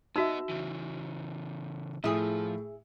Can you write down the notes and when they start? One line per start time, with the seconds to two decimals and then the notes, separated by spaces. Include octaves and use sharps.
0.16 B3 D#4 F#4 D#5 E5 E6
0.49 C#3 E3
2.04 A2 F3 E4 G#4